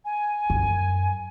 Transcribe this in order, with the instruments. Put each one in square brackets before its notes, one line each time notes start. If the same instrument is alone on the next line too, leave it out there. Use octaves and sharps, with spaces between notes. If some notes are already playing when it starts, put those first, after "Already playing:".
[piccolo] G#5
[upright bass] F#2